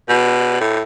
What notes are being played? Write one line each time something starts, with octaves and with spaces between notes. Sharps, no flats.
B2
A2